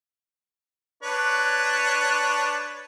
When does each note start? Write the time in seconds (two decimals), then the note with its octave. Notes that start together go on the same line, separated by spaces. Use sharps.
1.03 D4 B4 C#5